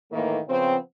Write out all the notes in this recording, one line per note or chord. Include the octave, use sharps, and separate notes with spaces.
A2 D#3 E3 A3 A#3
C#3 F3 B3 C4